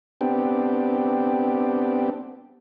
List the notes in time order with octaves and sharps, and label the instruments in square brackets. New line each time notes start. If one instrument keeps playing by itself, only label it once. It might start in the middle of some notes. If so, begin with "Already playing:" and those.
[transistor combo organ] B3 C4 D4 G4